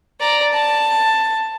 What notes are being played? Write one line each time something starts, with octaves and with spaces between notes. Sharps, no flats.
D5 A#5
A5